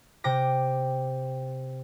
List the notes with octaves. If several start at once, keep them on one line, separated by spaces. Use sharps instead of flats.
C3 G5 D6 A#6